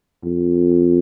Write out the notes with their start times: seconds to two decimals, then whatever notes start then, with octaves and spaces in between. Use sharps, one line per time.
0.24 F2